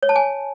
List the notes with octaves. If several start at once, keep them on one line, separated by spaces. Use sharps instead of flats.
C#5
A5
G#5